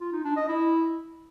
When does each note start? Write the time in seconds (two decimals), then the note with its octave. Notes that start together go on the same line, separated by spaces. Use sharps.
0.01 F4
0.13 D#4
0.24 D4
0.36 D#5
0.48 E4